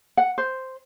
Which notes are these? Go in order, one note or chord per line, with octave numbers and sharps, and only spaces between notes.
F#5
C5